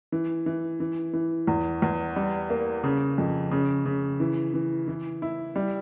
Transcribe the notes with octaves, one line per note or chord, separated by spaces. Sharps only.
E3
E3
E3
E3
E2
E2
G3
A#3
C#3
F2
C#3
C#3
E3
E3
E3
E4
G3